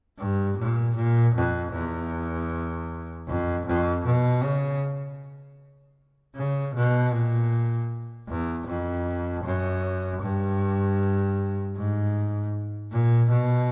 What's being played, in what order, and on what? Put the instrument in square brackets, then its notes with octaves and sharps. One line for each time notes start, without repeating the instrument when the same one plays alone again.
[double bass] G2
A#2
A#2
F2
E2
F2
F2
B2
C#3
C#3
B2
A#2
E2
F2
F#2
G2
G#2
A#2
B2